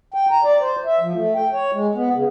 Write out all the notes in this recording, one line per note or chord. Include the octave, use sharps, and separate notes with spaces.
G5
A#5
D5
C5
E5
F3
A3
G5
C#5
G#3
B3
C#3